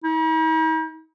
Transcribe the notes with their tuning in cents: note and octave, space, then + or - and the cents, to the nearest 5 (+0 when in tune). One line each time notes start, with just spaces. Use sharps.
D#4 +45